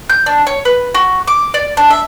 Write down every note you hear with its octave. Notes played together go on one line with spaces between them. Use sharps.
G6
D4
C#5
B4
F#4
D6
D5
D4
E5